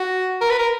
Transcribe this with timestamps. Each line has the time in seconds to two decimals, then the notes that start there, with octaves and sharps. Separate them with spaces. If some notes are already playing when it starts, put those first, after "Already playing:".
Already playing: F#4
0.41 A#4
0.50 B4
0.59 A#4